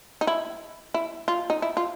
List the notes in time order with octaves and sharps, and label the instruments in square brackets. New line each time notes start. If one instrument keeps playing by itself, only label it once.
[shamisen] D#4
E4
E4
F4
D#4
E4
F4